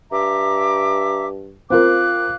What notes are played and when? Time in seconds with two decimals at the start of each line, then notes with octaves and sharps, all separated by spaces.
0.12 G2 E5 A#5 D6
1.70 C4 F4 A#4 F5 D6 F#6